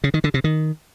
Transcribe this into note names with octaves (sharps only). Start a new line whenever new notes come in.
C#3
D#3
D3
C3
D#3